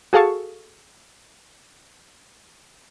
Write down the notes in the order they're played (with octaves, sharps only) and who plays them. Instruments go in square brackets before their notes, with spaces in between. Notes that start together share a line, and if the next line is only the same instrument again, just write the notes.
[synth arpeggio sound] F#4 G#4 A4 F5 A5 C#6